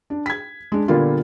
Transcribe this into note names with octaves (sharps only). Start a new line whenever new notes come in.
D4
G#6 B6
G#3 D4
A#2 D3 G3 A#3 B3 F4